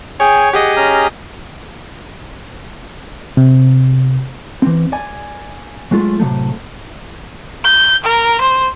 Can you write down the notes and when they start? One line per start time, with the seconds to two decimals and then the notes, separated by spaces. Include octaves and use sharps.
0.20 G#4 C#5 G5 G#5
0.53 G4 G#4 D#5 F#5
0.77 C#4 A#5 F6
3.37 C3
4.62 E3 C4
4.92 D5 G#5
5.91 F#3 G#3 A3 F4
6.20 A2 C3 F3 F#3 A3
7.64 G6
8.04 A#4
8.41 C5